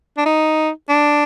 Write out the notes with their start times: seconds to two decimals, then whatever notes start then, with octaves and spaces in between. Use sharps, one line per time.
0.17 D4
0.26 D#4
0.89 D4